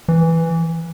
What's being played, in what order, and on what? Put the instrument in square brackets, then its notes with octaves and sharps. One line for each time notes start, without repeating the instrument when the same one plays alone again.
[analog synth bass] E3